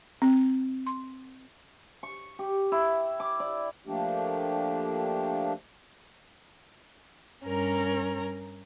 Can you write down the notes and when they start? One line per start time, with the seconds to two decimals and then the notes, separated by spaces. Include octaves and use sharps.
0.22 C4
0.87 C6
2.03 C#6
2.39 G4
2.72 E4
3.20 D6
3.40 D5
3.87 F3 A3 A#3 D4 G4
7.46 G2 C#4 A#4 A#5